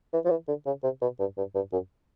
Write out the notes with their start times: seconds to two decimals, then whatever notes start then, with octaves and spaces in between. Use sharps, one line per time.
0.14 E3
0.25 F3
0.30 E3
0.48 D3
0.66 C#3
0.83 C3
1.02 B2
1.20 G2
1.38 G2
1.55 G2
1.73 F#2